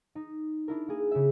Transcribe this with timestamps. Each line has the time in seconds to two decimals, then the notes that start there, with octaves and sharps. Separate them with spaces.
0.15 D#4
0.68 D4 E4 A#4
0.88 A#3 G#4
1.11 C#3 E5